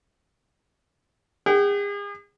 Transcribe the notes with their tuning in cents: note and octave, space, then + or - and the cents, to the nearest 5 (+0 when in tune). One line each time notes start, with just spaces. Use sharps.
G#4 -40 G5 -40